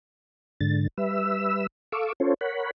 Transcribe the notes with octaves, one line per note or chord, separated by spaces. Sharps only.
G#2 D3 A6
G3 B4 E5 E6
A4 F5 C#6 D6 E6
C#4 F4 A4 C5 C#5
A#4 C#5 F#5 B5